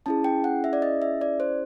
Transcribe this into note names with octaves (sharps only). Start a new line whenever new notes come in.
C#4 E4 G#4 A5
G5
F#5
E5
D5
D#5
E5
D5
C5